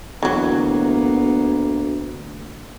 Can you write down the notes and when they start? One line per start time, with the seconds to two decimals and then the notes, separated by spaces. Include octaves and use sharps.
0.23 D2 E3 F#3 A#3 B3